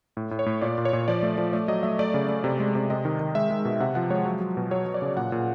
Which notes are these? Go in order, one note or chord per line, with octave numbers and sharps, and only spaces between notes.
A2
A2
C#5
A2
A#2 D5
A#2
C#5
A#2
F3 D5
A3
F3
A3 D5
F#3 D#5
A3 E5
A3 D5
C#3
A3
C3
G#3
C3
C3 D#5
D#3
D#3
G#3 E5
G#3
B2
C3 F#5
F3 F#5
G#3 C#5
F#3
F#3
B2
F#3 C#5
F#3
D5
C#3
A#2 F#5
A#2